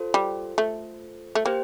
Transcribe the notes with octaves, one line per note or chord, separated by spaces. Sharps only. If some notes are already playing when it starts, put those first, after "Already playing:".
Already playing: F4 A4 C5
G3
A3
A3
A#3 G4 C5 G5